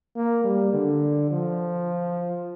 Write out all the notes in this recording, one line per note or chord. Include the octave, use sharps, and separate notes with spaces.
A#3
G3
D3
F3